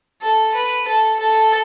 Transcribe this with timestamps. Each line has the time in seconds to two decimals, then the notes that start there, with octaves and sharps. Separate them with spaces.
0.22 A4
0.54 B4
0.88 A4
1.20 A4